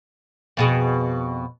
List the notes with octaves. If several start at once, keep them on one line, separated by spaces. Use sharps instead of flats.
F2 B2 G#4